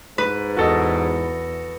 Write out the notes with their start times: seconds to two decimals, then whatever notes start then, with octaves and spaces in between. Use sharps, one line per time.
0.18 G#2 B4
0.57 E2 F#4 A4 D#5